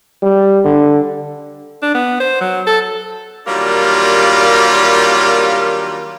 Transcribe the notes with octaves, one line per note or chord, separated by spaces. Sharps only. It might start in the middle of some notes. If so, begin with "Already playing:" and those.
G3
D3
D4
B3
C5
F#3
A4
D#3 F#3 G3 A#3 D4 F4